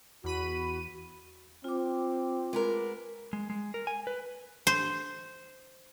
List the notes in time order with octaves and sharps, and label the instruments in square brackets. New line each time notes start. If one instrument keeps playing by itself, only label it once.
[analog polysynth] E2 B5 D#7 [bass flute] F#4
[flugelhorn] C4 [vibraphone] F4 D6
[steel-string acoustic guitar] G#3 B3 A#4
[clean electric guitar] G#3
G#3
A#4
G#5
B4
[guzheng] C5